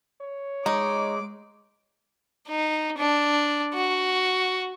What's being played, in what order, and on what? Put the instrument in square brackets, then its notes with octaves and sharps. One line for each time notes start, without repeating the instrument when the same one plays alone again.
[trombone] C#5
[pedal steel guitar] G#3 [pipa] D#4 [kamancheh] D6
[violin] D#4
D4
F#4